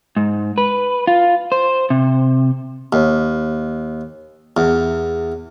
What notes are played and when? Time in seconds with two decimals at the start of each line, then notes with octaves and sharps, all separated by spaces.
0.16 G#2
0.58 B4
1.07 F4
1.52 C5
1.90 C3
2.93 D#2
4.57 E2